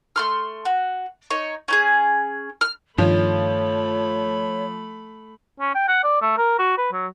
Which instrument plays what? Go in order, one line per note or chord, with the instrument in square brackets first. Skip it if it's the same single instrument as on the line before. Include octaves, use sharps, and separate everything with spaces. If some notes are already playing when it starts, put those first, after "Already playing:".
[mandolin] A3 C6 F6
F#4
D#4 C#5
C#4 D#4 G#4
F6
[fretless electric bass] G2 D#3 [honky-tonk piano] F3 [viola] A3 B5 [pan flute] C#5
[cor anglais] C#4
G5
F#5
D5
A3
A#4
F#4
B4
F#3